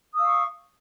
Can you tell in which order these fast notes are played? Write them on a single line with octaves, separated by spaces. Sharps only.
D#6 E6 F5 C#6